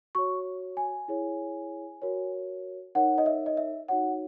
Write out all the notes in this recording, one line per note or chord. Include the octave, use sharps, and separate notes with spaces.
F#4 C#5 C#6
G#5
E4 G#4 C#5
F#4 A#4 C#5
D#4 A#4 C#5 F#5
D#5
E5
D#5
E5
D#4 F#4 C#5 F#5